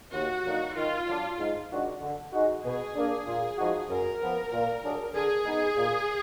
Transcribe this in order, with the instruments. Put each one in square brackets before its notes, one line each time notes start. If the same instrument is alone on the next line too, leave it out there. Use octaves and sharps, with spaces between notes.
[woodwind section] D#2 [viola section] F#4
[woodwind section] D3 F#3 A#3 D#4
[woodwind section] D#3 [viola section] F4
[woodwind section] F#3 D4
G#2
D#3 G#3 D4 F#4
D3
G#3 D#4 F#4
[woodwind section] B2 [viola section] G#4
[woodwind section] A#3 D4
A#2
F3 G#3 D#4 F#4
[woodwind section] F#2 [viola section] A#4
[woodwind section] F3 B3
A#2
F#3 D4 G#4
[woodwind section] D3 [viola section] G#4
[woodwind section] G#3 B3 D#4
A#2